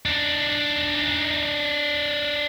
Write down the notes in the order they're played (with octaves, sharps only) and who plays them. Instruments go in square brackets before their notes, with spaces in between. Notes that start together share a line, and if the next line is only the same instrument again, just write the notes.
[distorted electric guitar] D4 D#4